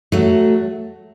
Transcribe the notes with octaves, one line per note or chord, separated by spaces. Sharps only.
F#3 A3